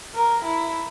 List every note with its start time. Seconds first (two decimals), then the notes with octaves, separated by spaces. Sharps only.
0.14 A#4
0.45 E4